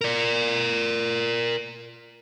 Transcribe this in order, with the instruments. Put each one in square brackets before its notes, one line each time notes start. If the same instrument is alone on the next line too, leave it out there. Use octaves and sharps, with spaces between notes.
[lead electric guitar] A#4 D5